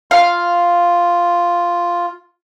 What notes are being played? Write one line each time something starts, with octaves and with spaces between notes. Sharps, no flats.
F4 F5